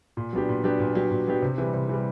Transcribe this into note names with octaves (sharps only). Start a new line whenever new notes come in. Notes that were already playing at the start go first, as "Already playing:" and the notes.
A#2
F#3 B3 D4 G4
A#2
F#3 B3 D4 G4
A#2
F#3 B3 D4 G4
A#2
F#3 B3 D4 G4
C3
E3 G3
C3
E3 G3